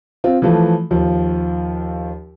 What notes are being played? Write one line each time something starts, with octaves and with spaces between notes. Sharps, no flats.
C4 F4
E3 F3 A3
D#2 F3